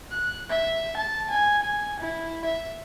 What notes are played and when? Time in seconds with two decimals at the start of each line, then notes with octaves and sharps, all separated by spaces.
0.11 F#6
0.50 E5
0.97 A5
1.30 G#5
1.63 G#5
2.00 E4
2.45 E5